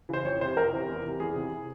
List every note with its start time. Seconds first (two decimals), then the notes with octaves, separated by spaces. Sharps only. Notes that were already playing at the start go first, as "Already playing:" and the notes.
0.09 C#3 E3 C5
0.25 F2 C#5
0.40 C3 E3 C5
0.56 F2 A#4
0.73 C3 E3
0.88 E2
1.04 C3 E3
1.20 E2 G#4
1.36 C3 E3